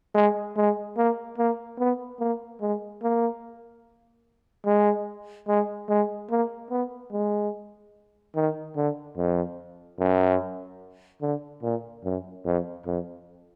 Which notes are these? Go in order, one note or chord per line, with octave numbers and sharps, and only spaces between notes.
G#3
G#3
A#3
A#3
B3
A#3
G#3
A#3
G#3
G#3
G#3
A#3
B3
G#3
D#3
D3
F2
F#2
D3
A#2
F#2
F2
F2